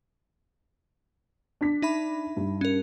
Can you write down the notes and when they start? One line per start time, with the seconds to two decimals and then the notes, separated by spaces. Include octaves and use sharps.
1.61 D4 B6
1.82 D#4 E5 B5
2.37 G2
2.61 C#4 A#4